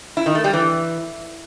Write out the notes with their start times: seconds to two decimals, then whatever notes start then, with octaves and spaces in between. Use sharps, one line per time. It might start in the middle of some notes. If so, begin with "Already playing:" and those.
0.17 E4
0.26 D#3
0.35 A3
0.44 G3
0.53 E3